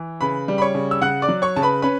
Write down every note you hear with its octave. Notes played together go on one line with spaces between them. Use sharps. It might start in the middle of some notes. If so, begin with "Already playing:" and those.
Already playing: E3
C#3 B4 B5
G3
B5
C#5 C#6
C#3
E6
C#3 F#5 F#6
D5 D6
F#3
C#5 C#6
C#3 A5
B4 B5
C#4 B4 B5